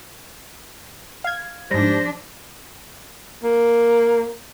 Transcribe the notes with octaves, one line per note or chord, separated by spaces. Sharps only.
F5 G#6
G#2 F3 G3 D4 C5 A#6
A#3